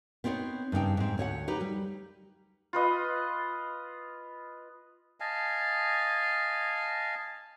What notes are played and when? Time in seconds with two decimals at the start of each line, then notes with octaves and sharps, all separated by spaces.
0.24 B3 C4 D#4 C5 C#5
0.72 G2 C#3 D#4 G5
0.97 G#2 C4
1.18 D2 C#5 D#5 F#5
1.48 D#4 G4 B4
1.61 G3
2.73 F4 B4 D#5
5.20 D#5 F5 G#5 A5